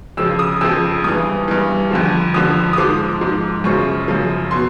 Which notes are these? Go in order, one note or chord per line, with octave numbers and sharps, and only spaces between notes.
F2 C#3 F3 E6
D#6
F2 C#3 F3 E6
G2 E3 D#6
G2 E3
F2 D3 F3
F2 D3 F3 D#6
D#6
G#2 F3 D6
G#2 F3
F#2 C#3 F3 C#6
F#2 C#3 F3
B2 C6